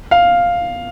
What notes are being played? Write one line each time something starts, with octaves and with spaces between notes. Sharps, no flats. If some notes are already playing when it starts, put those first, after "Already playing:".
F5